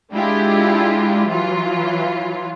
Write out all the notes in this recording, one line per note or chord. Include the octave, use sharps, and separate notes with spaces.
G#3 D4 E4 F4 G4
E3 F#3 F4